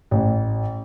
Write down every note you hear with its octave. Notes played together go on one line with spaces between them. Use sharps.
A1